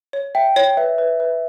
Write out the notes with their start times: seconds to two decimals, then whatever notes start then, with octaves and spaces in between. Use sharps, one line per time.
0.13 C#5
0.35 E5 G5
0.56 C#5
0.77 B4 E5
0.98 B4
1.20 B4